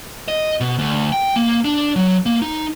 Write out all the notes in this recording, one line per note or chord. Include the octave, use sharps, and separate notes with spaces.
D#5
B2
D2
G5
A#3
D4
F#3
A#3
D#4